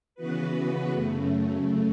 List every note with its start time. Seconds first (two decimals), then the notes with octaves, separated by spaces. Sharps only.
0.15 C#3 E3 B3 F#4 B4
0.90 F#2 C#3 A3